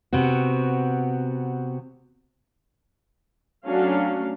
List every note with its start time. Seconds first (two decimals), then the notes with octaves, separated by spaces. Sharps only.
0.13 C3 B3 C4 F#4
3.66 F#3 A3 C#4 D4 F#4 F5